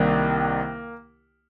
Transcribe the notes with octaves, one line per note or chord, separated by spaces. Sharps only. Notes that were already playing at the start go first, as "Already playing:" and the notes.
Already playing: C2 C3 D#3 A#3